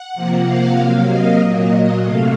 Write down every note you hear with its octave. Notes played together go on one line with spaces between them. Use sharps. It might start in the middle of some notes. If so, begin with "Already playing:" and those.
Already playing: F#5
C3 F3 A#3
F5
C3 F#3 A#3
D#5
A#2 F#3 A#3
C3 F#3 A3 F5